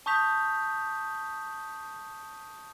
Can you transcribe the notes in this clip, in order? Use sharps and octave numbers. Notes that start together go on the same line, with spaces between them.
A5 C#6 D#6 G6 B6 F7